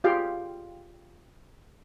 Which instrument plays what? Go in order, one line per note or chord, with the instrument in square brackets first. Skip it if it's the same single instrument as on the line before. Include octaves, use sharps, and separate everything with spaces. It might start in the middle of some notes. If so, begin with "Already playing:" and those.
[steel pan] F4 G4 G#4 F5 G5